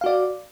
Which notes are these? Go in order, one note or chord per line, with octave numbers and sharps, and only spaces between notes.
F#4 D5 F5